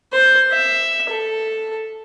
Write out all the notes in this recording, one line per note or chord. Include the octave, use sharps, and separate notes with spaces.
C5
E5
A4